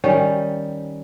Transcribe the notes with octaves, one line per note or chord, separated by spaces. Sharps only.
D#3 G3 C#4